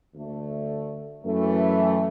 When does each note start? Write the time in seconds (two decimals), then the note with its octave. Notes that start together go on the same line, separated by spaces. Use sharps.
0.14 D2 D3 A3
1.24 F#2 E3 A3